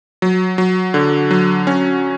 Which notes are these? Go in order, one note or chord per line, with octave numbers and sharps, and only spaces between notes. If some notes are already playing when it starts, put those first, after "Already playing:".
F#3
F#3
D3
F#3
C#4